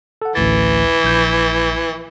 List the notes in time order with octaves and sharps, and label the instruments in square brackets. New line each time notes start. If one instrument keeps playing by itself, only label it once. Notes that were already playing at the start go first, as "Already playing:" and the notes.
[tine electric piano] A4 F#5
[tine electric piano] A1 D2 A6 [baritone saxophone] E3
[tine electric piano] A#1 G6